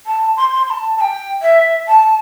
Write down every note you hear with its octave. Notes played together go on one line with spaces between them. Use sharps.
A5
C6
C6
C6
A5
A5
G5
E5
A5